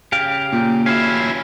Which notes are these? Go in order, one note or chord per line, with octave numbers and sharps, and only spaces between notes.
C#3 G4 F5 D7
A#2
C#4 E4 F#4 F5 E7